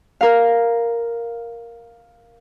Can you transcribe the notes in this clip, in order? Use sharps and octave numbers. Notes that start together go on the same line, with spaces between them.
A#4 F5